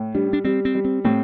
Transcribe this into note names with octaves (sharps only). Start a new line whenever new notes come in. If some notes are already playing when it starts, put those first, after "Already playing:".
Already playing: A2
G3 D4
D4
G3 C4
C4
G3
C4
A2 C4